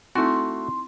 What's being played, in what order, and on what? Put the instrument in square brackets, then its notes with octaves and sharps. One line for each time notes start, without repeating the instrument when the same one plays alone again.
[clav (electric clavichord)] A3 F#4 [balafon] C4 D#4 E4 [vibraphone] C6